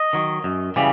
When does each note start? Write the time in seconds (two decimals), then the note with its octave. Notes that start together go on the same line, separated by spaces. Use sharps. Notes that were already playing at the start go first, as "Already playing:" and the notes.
Already playing: D#5
0.13 D#3 F#3
0.44 F#2
0.76 C#3 E3 G3